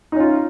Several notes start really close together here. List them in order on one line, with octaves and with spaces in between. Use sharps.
D#4 C#4 F4